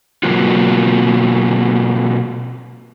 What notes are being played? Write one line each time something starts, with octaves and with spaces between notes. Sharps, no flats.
B2 F#3 A#3 C4 F4 F#4